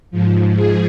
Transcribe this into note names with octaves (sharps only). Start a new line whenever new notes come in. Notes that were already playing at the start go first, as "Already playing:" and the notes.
G#2 F3
G#4